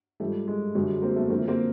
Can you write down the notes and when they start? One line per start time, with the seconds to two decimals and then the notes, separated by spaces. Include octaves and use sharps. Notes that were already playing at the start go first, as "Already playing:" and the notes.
0.20 G#2 F3 G3 A3
0.48 G#3
0.75 F#2 D3 F#3 G3
0.88 G#3
1.02 A#3 C4
1.16 A3 B3
1.29 F#2 D3 F3 A#3 C4
1.48 A#3 C4